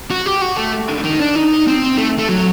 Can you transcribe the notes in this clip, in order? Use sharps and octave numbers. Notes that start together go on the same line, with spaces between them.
F#4
G4
F#4
A3
D#3
D4
D#4
C4
A3
A3
F#3